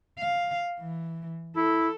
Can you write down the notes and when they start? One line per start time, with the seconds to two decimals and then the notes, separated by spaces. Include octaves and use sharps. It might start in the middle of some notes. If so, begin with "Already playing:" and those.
0.19 F5
0.79 E3
1.56 E4 A4